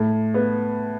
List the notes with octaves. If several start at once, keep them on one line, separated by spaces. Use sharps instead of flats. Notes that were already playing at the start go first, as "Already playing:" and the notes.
Already playing: A2
B3